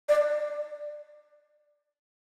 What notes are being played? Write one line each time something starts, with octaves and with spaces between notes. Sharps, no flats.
D5